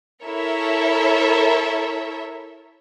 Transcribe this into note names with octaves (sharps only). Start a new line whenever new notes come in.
E4 A4 A#4 C#5 E5 E6